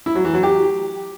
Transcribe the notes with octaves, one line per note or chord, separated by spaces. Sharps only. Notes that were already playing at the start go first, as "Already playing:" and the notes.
E4
F#3
E3
F#3
G4